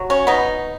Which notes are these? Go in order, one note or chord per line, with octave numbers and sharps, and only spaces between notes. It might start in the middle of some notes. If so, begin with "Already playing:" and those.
Already playing: F#3
C#4
B3 D#4